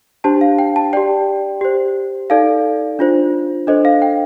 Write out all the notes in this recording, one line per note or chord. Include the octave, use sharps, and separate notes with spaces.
D4 G4 C5 A5
F5
G5
A5
G4 D5 G5
G4 C5
D#4 A4 D5 F5
D4 F4 C5
D4 A4 C5 D#5
F5
G5